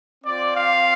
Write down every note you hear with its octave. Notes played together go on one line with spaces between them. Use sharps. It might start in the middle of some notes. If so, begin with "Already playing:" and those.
C4 F4 D5
F5